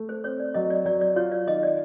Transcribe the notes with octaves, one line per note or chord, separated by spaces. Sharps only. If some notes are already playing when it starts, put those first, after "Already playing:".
Already playing: A3
C5
C4 C#5
D5
F#3 D#5
D5
F#3 D5
D5
F4 C#5
D5
D#3 D#5
D5